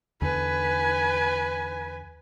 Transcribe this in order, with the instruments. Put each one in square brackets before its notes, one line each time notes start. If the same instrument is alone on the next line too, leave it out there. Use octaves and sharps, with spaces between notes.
[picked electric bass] E2 D3 [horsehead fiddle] B4 G#5